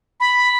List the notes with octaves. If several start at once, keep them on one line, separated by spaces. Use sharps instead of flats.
B5